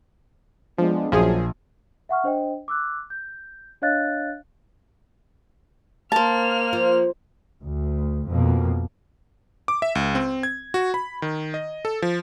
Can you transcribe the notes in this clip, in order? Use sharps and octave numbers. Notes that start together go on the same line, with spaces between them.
F3 G#3 B3 D4
A#1 F#2 F3 G#4
E5 F#5 C#6 F6
D4 C5 D#5 G5
D6 E6 F#6
G6
D4 C#5 D#5 F5 F#6 A6
A#3 C5 A5 F6
F3
D2
F2 B2 A#3
D6
E5
C#2
C4
G#6
F#4
B5
D#3
D#5
A4
F3